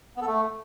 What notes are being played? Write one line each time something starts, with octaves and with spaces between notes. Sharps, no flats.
B3
A4
A3